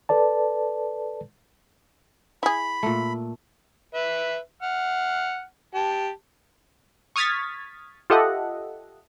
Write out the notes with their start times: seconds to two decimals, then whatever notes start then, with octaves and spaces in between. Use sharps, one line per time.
0.09 A4 B4 D5 A5
2.43 E4 G#4 B5
2.83 A#2 A3
3.95 B4 E5
4.62 F#5 F6
5.75 G4 A5
7.16 C#6 D#6 F6 G#6 A6 B6
8.10 F4 G4 A4 D#5 E5 F#5